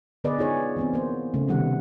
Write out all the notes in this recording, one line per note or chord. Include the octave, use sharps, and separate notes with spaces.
D3 B3 G#4 B4 D5 D#5
D#4 F4 G#4 C#5
E3 B3 C4
A#3 C5
C#3 A3
C3 D#3 G3 B3 F#5